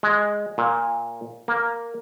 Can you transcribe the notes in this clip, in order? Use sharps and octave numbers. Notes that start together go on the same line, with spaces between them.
G#3
A#2
A#3